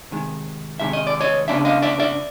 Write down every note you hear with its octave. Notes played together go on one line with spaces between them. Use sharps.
C3 D#3 G#3
C3 D#3 G#3 E5
D#5
D5
C#5 D#5
C#3 F#3 B3 D4 D5 E5
D#5 F5
D5 E5
D5 E5